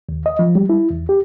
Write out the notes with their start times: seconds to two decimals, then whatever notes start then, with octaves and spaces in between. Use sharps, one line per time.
0.09 D#2
0.26 D#5
0.39 F3
0.55 G3
0.69 E4
0.91 E2
1.09 G4